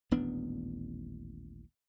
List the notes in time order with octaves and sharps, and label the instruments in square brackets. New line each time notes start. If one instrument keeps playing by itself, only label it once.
[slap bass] D#1 A1 B3 D4